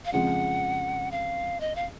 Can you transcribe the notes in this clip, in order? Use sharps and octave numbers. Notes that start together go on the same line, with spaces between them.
F5
F2 C#3 F3 G#3 F#5
F5
D#5
F5